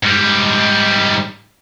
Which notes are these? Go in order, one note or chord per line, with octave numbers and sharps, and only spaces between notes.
G#2 G3